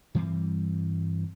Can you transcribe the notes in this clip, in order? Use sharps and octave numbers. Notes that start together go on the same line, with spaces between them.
G2 E3 G3 C4